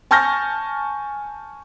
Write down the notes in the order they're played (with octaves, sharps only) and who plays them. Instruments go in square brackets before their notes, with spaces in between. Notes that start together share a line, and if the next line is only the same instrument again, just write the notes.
[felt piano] G#5 A5 C#6 F6 G6 A#6